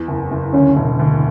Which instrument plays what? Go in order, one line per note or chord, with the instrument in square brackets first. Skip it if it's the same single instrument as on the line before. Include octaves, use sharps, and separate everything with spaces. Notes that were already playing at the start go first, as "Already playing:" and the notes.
Already playing: [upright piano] E2
F#1
F#1
[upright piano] D2 [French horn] C#4
[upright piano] E1
D2